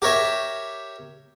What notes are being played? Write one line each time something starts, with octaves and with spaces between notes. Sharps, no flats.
G4 A#4 C#5 E5